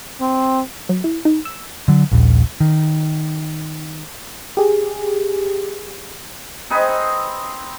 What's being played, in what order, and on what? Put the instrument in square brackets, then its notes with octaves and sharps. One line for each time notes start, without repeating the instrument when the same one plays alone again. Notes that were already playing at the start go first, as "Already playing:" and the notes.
[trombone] C4
[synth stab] F#3
E4
D#4
E6
[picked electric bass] D3 F#3
D#1 A#1
D#3
[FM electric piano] G4 G#4
[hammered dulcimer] C4 D#4 G#4 B4